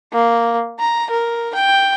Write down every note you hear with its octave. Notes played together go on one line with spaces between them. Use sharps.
A#3
A#5
A#4
G5